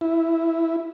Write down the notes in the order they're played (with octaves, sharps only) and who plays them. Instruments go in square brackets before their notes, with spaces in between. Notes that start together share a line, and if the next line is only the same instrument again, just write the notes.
[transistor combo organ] E4